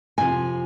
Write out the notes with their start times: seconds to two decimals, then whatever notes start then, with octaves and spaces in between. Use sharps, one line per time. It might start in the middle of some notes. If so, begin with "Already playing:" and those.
0.18 F2 C3 F3 G#5